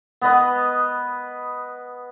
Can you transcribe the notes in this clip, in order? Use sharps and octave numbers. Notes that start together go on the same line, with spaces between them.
B3 B4 D#5